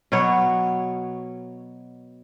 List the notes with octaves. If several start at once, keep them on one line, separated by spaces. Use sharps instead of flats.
B2 F#3 B3 C#5